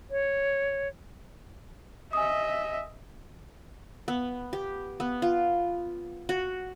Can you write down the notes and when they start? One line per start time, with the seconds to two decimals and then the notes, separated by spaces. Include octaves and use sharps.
0.11 C#5
2.13 D#5 E5 G#5 D#6
4.08 B3
4.53 G4
5.00 B3
5.22 F4
6.29 F#4